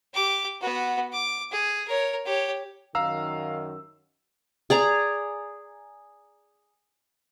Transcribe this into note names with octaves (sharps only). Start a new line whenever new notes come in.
G4 D6
B3 F#4
D6
G#4
A#4 C#5
G4 C#5
F#2 D#3 F5 A#5 E6
G#4 D5 A#5